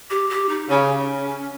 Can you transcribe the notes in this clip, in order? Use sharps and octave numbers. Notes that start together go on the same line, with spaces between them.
G4
G4
D#4
C#3 C#4